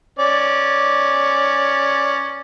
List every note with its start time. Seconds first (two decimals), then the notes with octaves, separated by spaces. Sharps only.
0.19 C#4 D5